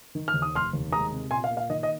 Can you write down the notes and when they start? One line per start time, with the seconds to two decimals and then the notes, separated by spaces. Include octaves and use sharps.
0.15 D#3
0.28 F6
0.34 D#2
0.42 D#6
0.54 F1 C6 F6
0.73 D#2
0.93 G#3 A#5 D#6
1.12 C3
1.31 A#2 G#5 C6
1.44 F5
1.51 A#3
1.57 F5
1.70 D#3 D#5
1.83 D#5